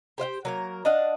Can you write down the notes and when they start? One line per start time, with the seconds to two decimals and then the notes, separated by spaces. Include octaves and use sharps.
0.18 G4 C5 F5 G5
0.45 F#3 A#3 A#4
0.85 D4 D#5 F5 F#5